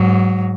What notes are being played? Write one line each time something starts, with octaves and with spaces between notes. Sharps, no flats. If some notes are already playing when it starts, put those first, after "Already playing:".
Already playing: G#2 F#3